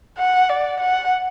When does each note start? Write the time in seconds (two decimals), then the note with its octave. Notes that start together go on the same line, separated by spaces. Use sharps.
0.18 F#5
0.49 D5
0.80 F#5